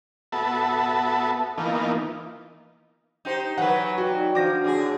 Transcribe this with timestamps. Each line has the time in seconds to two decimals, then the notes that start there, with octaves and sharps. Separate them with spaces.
0.32 B3 F#4 A4 E5 A5 B5
1.58 E3 A#3 B3 D#4 F4
3.25 D#4 G4 C5
3.58 E3 F#3 B4 F#5
3.98 D#4 F#4 D5 G5
4.35 F3 D4 F#4 D6 A#6
4.64 A2 D3 G#4